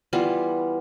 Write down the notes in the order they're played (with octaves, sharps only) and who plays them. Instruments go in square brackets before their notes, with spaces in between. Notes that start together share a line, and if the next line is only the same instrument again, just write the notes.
[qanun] E3 G3 B3 F4